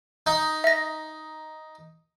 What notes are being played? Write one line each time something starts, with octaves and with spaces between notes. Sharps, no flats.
D#4
E5 A#6